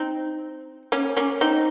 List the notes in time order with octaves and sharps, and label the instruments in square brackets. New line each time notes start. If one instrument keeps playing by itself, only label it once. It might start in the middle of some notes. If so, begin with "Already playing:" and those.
Already playing: [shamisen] C4 D#4
A#3 C#4
A#3 C#4
C4 D#4